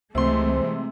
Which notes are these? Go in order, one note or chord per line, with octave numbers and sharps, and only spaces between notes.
C#2 C3 E3 G#3 A3 C5 C6